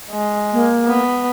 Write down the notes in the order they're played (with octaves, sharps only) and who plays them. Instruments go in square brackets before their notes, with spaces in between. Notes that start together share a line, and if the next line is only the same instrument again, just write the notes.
[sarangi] G#3
[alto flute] A#3
[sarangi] B3